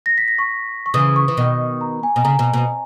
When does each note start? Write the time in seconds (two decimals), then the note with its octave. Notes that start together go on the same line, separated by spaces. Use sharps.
0.06 A#6
0.18 B6
0.28 A#6
0.39 C#6
0.86 C#6
0.94 C#3 E3 D#6
1.16 C#6
1.28 E3
1.37 B2 D#3
1.81 A#5
2.03 G#5
2.16 B2 G#5
2.24 C#3 A#5
2.39 B2
2.53 B2